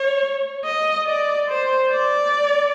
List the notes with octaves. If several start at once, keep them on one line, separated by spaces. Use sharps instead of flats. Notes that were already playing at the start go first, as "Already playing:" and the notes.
Already playing: C#5
D#5
D5
C5
D5